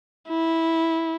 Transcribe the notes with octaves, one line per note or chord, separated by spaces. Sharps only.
E4